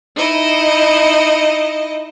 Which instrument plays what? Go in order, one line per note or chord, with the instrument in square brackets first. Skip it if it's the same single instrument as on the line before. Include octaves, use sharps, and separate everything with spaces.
[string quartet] D#4 E4 D#5